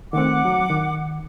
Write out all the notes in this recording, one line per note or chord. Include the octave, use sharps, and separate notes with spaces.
D#3 A3 C4 F#5 D6
F#3
D#3